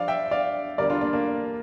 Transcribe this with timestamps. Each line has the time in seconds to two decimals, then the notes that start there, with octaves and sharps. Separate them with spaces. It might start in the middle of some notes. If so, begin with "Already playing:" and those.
Already playing: G2 F3 D5 F5
0.08 E5 G5
0.31 D5 F5
0.78 E2 D3 G3 A#4 D5
0.90 D4 F4
1.01 A#3 D4
1.13 A#3 D4